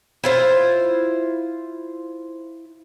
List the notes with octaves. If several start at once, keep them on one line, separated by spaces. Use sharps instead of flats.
E4 F4 C5